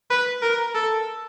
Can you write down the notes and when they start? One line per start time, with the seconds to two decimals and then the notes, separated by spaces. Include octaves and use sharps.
0.10 B4
0.42 A#4
0.75 A4